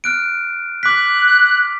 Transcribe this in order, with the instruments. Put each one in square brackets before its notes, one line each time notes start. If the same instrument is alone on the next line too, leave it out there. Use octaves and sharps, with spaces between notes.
[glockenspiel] F6 F#6 D7
[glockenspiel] D6 B6 [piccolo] F#6